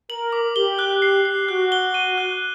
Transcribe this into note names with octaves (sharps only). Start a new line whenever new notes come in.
A#4 F#7
D6
G4 G7
F#6
C7
C7
F#4 F#6
G7
D#7
F#6